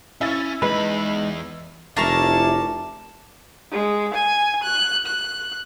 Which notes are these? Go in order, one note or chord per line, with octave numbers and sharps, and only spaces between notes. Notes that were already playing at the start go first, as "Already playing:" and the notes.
C#4 E4 A6
E2 G#3 D#4 B4 B5
F1 D4 E4 G#4 A#4 A5 C#6
G#3
G#5
F#6
F#6